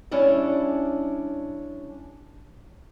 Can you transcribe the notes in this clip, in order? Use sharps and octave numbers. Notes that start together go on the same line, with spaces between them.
G3 C#4 D4 E4 D5